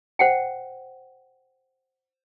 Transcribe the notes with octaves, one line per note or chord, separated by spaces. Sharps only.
C5 F#5 G5